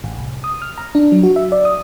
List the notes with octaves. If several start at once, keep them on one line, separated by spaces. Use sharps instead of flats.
A1
C2
D#6
F6
A#5
D4
F#3
F#4
E5
D5
D#6